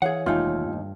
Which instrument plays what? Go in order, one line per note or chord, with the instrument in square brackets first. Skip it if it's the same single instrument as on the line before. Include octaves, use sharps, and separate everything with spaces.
[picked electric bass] E3 [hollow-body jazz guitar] G#4 F5 F#5 [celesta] C#5
[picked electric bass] F1 E3 G#3 [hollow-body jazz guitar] D#2 A3 D#4 [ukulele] F4
[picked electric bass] G2